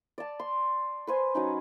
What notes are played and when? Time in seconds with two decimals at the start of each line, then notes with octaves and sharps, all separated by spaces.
0.18 D5 A5
0.40 C6
1.07 B4 C5 G#5
1.35 F#3 C#4 D#4